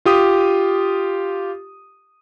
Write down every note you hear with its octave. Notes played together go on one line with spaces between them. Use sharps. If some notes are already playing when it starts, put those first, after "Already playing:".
F4 G4 D#6